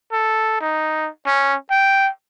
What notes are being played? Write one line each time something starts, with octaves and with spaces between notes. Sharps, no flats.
A4
D#4
C#4
G5